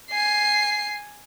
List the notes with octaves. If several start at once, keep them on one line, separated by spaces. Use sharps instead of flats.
G#5 C7